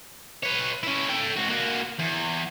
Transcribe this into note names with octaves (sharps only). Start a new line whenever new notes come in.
B4 C#5
C#4 E4
A4 G5
G#2 F#4
A#3 F#4
E2